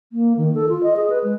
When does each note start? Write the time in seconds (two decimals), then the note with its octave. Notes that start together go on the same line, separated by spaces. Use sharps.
0.12 A#3
0.37 D#3
0.55 A4
0.69 F4
0.83 D#5
0.96 G#4
1.10 B4
1.24 G#3